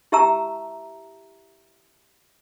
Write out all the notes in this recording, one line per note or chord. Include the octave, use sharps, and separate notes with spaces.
E4 G4 E5 A5 A#5 E6